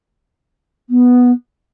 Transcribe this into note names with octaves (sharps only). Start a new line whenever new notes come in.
B3